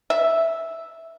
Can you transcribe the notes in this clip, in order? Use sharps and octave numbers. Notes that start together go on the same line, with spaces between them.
E5